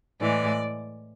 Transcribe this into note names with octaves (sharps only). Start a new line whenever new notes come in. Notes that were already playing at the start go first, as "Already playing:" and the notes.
A2 E3 G#3 D5